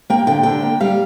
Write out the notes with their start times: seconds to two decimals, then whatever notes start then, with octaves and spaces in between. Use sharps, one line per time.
0.10 A#3 G5
0.27 D3 G5
0.43 D3 G5
0.62 A#3
0.80 G3 F5